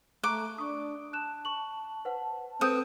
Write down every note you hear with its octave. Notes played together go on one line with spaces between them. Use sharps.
A3 A#5 C#6 D6 F#6
D4 C#6 D#6
A5 F#6 E7
C#6 F#7
B4 C5 F#5
C4 A4 B4 D#6 G6